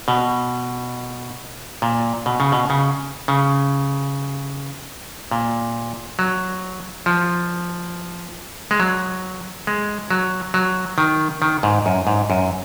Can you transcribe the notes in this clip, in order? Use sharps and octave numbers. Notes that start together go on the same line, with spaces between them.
B2
A#2
B2
C#3
B2
C#3
C#3
A#2
F#3
F3
G#3
F#3
G#3
F#3
F#3
D#3
D#3
G#2
F#2
G#2
F#2